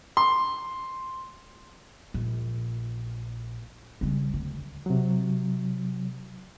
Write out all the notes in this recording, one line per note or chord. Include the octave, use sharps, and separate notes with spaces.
C6
A#1
C#3 G3
D2
C3 F#3